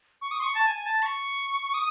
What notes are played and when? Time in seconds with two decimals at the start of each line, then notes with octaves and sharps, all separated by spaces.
0.21 C#6
0.31 D#6
0.39 C6
0.43 C#6
0.55 A5
0.67 G#5
0.84 A5
1.02 C#6
1.74 D#6